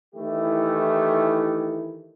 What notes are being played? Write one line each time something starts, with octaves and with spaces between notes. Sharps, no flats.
D#3 E3 A3 E4 G4